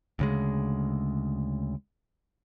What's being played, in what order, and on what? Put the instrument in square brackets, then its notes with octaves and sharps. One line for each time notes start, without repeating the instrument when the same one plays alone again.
[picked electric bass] D2 C#3 G#3